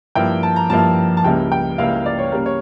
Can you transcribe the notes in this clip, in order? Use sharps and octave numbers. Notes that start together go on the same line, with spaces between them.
G2 F3 A#3 E4 G5
A5
A#5
G2 F3 A#3 E4 A5
A5
C#2 C#3 G3 A#3 E4 G5
G5
C#2 C#3 G3 A#3 E4 F5
D5
C#5
C#3 G3 A#3 A#4
C#5